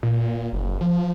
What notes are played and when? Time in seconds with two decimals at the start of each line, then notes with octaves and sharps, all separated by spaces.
0.03 A#2
0.26 A#2
0.53 F#1
0.81 F3